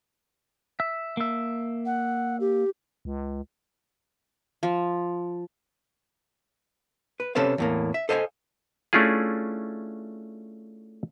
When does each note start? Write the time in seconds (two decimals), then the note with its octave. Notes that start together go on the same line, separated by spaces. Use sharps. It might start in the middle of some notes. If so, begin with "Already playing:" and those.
0.80 E5
1.17 A#3 E5
1.86 F#5
2.40 G4
3.05 C#2
4.63 F3
7.20 B4
7.35 C3 C#4 A4 B4 C5 F5
7.58 E2 A2 A#3
7.94 E5
8.09 A4 C5 D#5 F5 G5 G#5
8.93 A3 C#4 D4 E4 F4 G#4